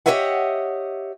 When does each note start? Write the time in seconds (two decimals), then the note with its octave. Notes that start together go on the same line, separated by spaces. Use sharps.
0.06 G4 A4 C#5 D#5 E5 F#5